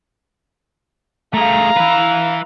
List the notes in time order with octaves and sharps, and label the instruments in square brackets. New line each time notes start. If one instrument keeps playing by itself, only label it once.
[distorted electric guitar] A3 G#4 [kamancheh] F5 A#5
[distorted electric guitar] E4 B4